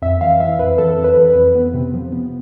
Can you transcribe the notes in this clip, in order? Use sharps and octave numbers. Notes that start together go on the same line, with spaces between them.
F2 E5
E3 F5
E3 E5
F2 B4
E3 A4
F2
B4
E3
B4
F2
B3
C3
F3
B3